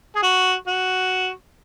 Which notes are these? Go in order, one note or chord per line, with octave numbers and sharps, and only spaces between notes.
G#4
F#4
F#4